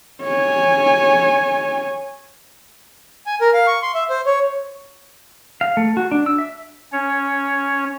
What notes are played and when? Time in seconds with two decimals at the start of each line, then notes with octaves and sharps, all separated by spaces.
0.23 C#5 G#5
3.26 G#5
3.41 A#4
3.54 F5
3.67 C#6
3.82 C6
3.94 E5
4.10 C5
4.26 C#5
5.61 F5
5.77 A3
5.97 F#4
6.12 D4
6.26 E6
6.38 E5
6.92 C#4 C#5